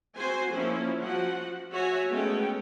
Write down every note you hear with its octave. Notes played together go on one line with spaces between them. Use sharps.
C4 F#4 C5 G#5
F3 A#3 C#4 E4
F3 F#4 F#5
F#4 C#5 E5 G#5
G#3 A3 B3 C#4 G5